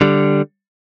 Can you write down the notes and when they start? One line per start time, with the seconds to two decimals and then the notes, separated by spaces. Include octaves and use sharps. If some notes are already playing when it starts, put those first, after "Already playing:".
0.01 D3 G3